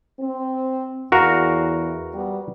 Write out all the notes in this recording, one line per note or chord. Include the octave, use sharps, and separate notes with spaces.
C4
E2 F#4 A#4 F5
G3 B3